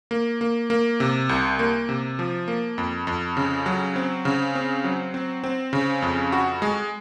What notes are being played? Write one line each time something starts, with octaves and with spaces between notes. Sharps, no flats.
A#3
A#3
A#3
C3
C2
A#3
C3
F3
A#3
F2
F2
C#3
F#3
C4
C#3
C4
F#3
C4
C4
C#3
F2
F#4
G#3